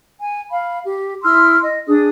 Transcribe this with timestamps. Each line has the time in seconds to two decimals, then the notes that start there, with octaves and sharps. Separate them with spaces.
0.19 G#5
0.51 F5 B5
0.83 G4
1.23 E4 C6 E6 F6
1.63 D#5
1.87 D4 G#4 D#6